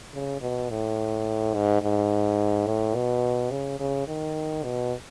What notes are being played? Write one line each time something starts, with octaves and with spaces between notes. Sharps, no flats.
C#3
B2
A2
G#2
G#2
A2
B2
C#3
C#3
D#3
B2